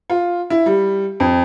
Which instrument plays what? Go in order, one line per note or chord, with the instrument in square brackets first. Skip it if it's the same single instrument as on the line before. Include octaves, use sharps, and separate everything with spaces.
[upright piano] F4
E4
G3
F2